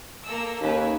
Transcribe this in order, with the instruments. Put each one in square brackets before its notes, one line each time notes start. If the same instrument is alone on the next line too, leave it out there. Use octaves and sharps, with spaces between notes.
[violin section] A#3 A4 E6
[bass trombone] D#2 [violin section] C#4 E4 B4